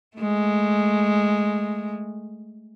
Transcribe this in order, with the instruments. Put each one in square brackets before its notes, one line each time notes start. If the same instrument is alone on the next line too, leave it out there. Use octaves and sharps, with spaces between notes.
[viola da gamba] G#3 A3